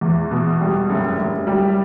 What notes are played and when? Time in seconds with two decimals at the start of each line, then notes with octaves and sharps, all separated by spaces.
0.01 E2
0.31 B2
0.61 G3
0.90 F#1
1.19 F#1
1.47 G3